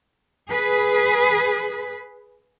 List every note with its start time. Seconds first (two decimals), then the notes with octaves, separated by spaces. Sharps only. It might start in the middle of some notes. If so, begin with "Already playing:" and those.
0.50 G#4 B4